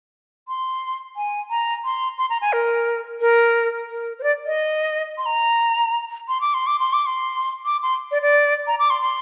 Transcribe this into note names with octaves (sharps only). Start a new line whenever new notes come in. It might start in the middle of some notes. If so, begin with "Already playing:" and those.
C6
G#5
A#5
C6
C6
A#5
G#5
A#4
A#4
A#4
C5
D5
D#5
C6
A#5
C6
D6
C6
D6
C6
D6
C6
D6
C6
D5
D5
A#5
D6
C6
C6